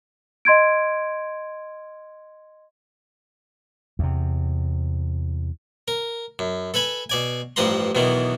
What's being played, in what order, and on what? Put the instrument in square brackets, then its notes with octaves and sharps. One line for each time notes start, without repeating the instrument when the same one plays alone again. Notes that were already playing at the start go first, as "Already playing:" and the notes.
[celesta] D#5 C6 G#6 D7
[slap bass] E2 C3
[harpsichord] A#4
F#2
A4 B4 G#5 B5
B2 D5 G#5
A1 G2 F3 B4 A#5 C6
B1 E2 B2 D#3 E3 B3